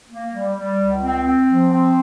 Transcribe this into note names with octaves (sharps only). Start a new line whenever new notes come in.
A#3
G3
G3
C#2
C4
C4
F3
C4